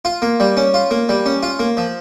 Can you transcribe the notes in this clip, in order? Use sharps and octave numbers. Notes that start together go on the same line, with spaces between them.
F4
A#3
G3
C#4
F4
A#3
G3
C#4
F4
A#3
F3